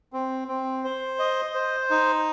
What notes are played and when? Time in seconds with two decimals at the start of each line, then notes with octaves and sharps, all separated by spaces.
0.13 C4
0.48 C4
0.84 C5
1.19 D#5
1.54 C5
1.90 D#4